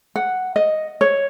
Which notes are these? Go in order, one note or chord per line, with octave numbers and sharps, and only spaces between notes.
F#5
D#5
C#5